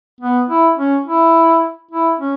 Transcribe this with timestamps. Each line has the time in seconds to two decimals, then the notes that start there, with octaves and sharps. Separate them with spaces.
0.20 B3
0.49 E4
0.77 C#4
1.05 E4
1.91 E4
2.20 C#4